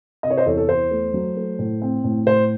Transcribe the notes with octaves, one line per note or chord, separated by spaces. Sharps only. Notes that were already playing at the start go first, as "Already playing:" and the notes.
C3 D#5
C#5
C5 D#5
E2 A4 C#5
A4
E2 C5
A3
F#3
A3
A2
C4
A2
A2 C5